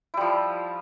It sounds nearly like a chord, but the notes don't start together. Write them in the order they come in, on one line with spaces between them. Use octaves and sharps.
E4 G3 F3